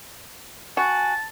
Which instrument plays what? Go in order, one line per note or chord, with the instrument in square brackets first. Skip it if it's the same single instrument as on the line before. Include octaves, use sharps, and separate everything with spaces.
[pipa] F#4 [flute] G#5 [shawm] A5